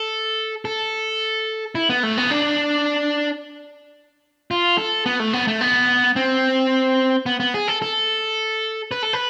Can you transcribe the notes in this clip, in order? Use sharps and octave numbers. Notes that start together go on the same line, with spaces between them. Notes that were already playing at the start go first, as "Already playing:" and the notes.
Already playing: A4
A4
E4
B3
A3
B3
D4
F4
A4
B3
A3
B3
A3
B3
C4
B3
B3
G#4
A4
A4
B4
A4
B4